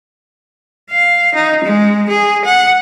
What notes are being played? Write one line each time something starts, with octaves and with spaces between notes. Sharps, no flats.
F5
D#4
G#3
G#4
F#5